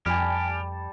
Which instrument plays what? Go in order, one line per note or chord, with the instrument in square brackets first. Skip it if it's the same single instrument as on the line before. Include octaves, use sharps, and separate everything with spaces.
[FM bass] F2 [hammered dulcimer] G3 D5 A5 [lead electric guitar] G4 [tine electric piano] G#5 F6